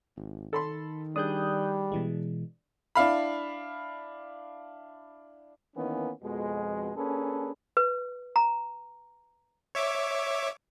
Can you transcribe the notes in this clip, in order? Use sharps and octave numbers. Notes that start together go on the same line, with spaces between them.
G#1
D#3 A4 B5 C6
G3 D4 G#4 D#6 F#6 G6
B2 E3 G#3
D4 E4 F5 B5
D#3 E3 A#3 B3 C#4
F2 B2 G#3
A#3 C#4 D4 G#4 A4 B4
B4
A#5
C#5 E5 D6